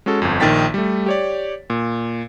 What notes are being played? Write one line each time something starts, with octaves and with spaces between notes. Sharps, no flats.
G#3 C#4 F#4 A4
G1 F2
A#1 D#3 D#4 G5 A6 B6
G3 A3
G4 C#5 D5
A#2